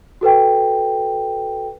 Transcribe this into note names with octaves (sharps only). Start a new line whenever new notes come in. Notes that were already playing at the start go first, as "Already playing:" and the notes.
F#4 A4 B4 G5